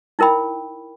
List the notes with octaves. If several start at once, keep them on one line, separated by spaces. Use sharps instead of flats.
D#4 E4 A#4 G5 B5